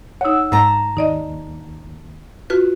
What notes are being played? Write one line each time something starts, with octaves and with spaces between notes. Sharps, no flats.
D#4 C#5 F#5 E6
G#2 G#3 A5 A#5
D#2 D#4 D5 D#5
F4 F#4 B4 F#6